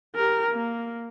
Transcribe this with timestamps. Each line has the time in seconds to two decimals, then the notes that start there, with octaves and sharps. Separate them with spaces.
0.16 G4 A#4
0.52 A#3